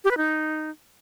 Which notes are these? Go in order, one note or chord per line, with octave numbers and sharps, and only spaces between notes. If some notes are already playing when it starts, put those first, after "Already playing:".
G4
B4
D#4